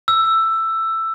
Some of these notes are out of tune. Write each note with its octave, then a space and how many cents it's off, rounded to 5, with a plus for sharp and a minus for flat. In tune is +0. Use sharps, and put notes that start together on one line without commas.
E6 +10